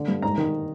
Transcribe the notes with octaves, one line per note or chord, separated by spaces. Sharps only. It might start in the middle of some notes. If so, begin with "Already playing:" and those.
Already playing: D3
G2
G#2 A#5
D#3